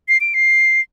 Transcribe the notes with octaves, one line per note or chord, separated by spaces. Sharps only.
C7
D7
C7